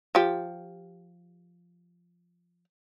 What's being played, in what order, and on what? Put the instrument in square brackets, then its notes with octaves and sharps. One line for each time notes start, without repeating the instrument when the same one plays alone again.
[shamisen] F3 G4